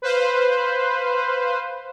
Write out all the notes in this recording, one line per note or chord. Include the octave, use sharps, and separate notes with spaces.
B4 C5 F5